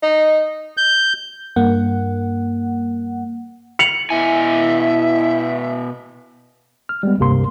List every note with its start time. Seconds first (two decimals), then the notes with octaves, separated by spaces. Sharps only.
0.03 D#4
0.77 G6
1.56 G2 A#3 F#5
3.79 C#7 F7 F#7
4.10 B2 E4 E5 G#5
6.89 F6
7.03 G3 G#3 B3
7.18 G#1 C#2 G2 C3 A#3 C6